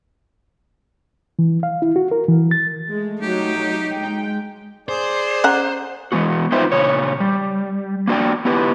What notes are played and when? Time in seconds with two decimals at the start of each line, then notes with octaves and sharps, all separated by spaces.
1.39 E3
1.63 F5
1.82 E4
1.96 F#4
2.11 A#4
2.29 E3
2.51 A6
2.90 G#3 A3
3.22 F#3 D#4 G4
3.91 G#3 G5
4.89 G#4 C5 D5
5.44 C#4 F#5 A#5
6.12 E3 G#3 B3 F#4
6.52 D#4 F4 B4 C5 E5 G5
6.72 A#2 C#3 C#5
7.20 G3
8.08 A#3 D4 F#4 C5 D5 G5
8.45 B3 E4 G4 B4